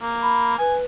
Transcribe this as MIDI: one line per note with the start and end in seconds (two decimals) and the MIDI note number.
0.02 0.56 58
0.22 0.55 83
0.59 0.85 71
0.59 0.75 80